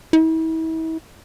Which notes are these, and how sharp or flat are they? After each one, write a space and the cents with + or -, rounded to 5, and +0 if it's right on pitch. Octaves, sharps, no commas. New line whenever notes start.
E4 -40